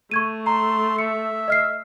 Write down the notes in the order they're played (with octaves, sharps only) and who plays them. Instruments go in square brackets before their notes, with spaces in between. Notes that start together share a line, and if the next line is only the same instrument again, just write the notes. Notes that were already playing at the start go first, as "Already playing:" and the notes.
[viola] A3 [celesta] C#6 G#6 D#7
[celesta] A#5 [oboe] C6
[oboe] E5 [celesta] C#7
[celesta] D#5 F6 C7